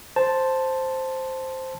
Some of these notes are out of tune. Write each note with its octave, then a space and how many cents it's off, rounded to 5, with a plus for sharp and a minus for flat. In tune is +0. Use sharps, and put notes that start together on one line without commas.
C5 +0 A5 +0